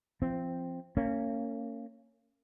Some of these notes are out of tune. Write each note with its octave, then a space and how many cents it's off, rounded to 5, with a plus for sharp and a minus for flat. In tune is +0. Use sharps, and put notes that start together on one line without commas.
F3 -25 C4 +0
A#3 -30 C#4 +0